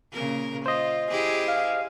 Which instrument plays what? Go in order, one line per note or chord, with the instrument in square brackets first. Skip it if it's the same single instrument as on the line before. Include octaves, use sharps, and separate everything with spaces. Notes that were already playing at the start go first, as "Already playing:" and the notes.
[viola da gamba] A#2 C#3 A#4
[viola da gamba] F4 [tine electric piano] C5 D#5
[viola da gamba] E4 G4 G#4
[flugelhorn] F5